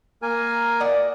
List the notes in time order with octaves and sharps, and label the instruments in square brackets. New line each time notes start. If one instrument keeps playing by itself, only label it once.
[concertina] A#3 A#4 G#5
[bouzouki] F#4 D5 D#5